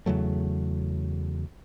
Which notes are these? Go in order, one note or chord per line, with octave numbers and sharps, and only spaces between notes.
E2 C#3 F#3 A3